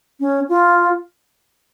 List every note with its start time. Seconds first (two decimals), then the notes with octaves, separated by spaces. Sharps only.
0.20 C#4
0.49 F4